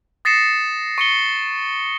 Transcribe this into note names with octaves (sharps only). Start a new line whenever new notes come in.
D#6 A6 A#6 C7 C#7 E7
C#6 C#7 G7